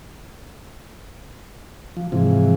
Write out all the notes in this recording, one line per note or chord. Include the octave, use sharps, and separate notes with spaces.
F3
G#2 C3 E3 F3